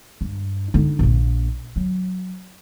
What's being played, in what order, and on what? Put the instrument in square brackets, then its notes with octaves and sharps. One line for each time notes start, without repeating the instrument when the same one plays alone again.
[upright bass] G2
D3 D#4
A#1 A#3
F#3